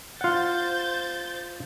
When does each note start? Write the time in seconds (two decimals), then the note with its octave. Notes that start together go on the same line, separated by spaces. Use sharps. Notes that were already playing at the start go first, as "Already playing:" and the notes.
0.21 F4 C5 F#5 G6 A6